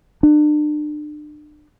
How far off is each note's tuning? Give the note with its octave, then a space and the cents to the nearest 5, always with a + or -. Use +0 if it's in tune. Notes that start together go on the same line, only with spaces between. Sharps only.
D4 +35